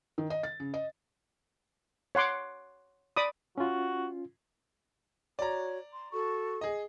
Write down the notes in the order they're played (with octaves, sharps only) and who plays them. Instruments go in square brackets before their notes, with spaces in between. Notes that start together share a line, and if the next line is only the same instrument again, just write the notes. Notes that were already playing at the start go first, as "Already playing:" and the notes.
[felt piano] D#3
D#5
A6
C#3
D#5
[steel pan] C#5 F#5 C6 D6
D5 B5 D6 D#6
[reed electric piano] C#4 F4 [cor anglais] F#4
[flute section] F#4 C#5 [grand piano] D5 A#5
[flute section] C6
F#4 A4 C#6
[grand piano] G#4 D#5